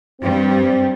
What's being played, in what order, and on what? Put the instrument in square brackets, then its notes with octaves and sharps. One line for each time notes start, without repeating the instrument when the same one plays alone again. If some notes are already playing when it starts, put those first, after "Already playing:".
[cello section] G2 G3 [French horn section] C4